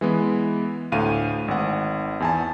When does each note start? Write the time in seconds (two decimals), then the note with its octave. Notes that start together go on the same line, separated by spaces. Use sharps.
0.01 E3 G#3 B3
0.92 D2 A2 F5 D#7
1.48 G#1 F#5
2.20 E2 G#5 A5